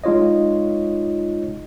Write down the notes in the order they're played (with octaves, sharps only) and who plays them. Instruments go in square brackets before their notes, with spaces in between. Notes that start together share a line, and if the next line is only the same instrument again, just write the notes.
[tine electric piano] G#3 D#4 F4 C#5 D#5